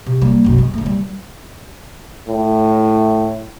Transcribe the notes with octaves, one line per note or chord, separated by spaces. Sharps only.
C3
G3 A#3
F#1 B1
G#3
D3 A3
G3
A2